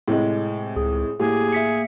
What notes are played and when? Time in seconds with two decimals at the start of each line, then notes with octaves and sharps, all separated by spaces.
0.08 A2 C3 G#3
0.76 C#2 G#4
1.20 A2 A#3 G4 G#4
1.52 E5 B6 C#7